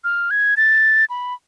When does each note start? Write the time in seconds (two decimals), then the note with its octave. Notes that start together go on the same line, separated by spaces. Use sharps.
0.04 F6
0.31 G#6
0.57 A6
1.10 B5